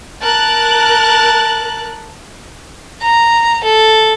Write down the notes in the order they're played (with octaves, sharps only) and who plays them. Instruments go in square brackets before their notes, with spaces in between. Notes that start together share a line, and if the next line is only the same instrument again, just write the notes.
[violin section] A#4 F#6 [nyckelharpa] A5
[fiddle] A#5
A4